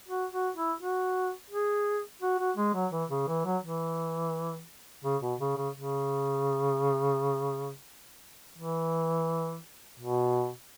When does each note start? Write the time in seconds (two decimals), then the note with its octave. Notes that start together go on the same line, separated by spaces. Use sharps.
0.09 F#4
0.33 F#4
0.56 E4
0.81 F#4
1.50 G#4
2.22 F#4
2.39 F#4
2.57 G#3
2.74 F#3
2.92 E3
3.10 C#3
3.28 E3
3.45 F#3
3.63 E3
5.05 C#3
5.22 B2
5.40 C#3
5.57 C#3
5.75 C#3
8.58 E3
10.00 B2